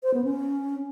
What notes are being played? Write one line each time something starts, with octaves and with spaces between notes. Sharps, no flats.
C5
B3
C#4